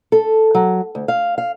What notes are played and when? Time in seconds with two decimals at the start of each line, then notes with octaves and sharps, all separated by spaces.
0.12 A4
0.55 F#3
0.95 D2
1.08 F5
1.38 F5